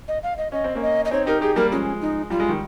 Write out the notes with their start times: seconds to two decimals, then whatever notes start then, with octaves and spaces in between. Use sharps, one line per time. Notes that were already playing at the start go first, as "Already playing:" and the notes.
0.08 D#5
0.23 F5
0.38 D#5
0.52 C#4 D#5
0.64 C4
0.75 A#3 C#4
0.82 D#5
1.05 D#5
1.11 C4 D#4 C#5
1.26 D#4 G4 A#4
1.41 D#4 G4 G#4
1.56 G3 A#3 A#4
1.72 F3 G#3 C#4
2.01 D#4
2.30 G3 F4
2.40 G#3
2.49 D#3 G3